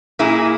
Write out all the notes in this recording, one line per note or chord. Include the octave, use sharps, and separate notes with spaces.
A#2 A#3 E4 G#4